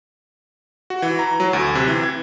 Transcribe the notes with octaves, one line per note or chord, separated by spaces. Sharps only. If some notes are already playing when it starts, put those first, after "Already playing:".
F#4
E3
A#5
F#3
D2
C3
E3
G#6